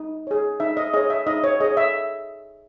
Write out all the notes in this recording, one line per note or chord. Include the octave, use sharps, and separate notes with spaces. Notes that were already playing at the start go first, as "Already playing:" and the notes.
Already playing: D#4
G#4 C#5
D#4 E5
D#5
G#4 C#5 D#5
E5
D#4 D#5
C#5
G#4 C#5 D#5
E5